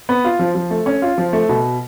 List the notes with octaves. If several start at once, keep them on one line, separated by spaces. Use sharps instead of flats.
B3
F4
F3
F3
A3
C#4
F4
F3
A3
B2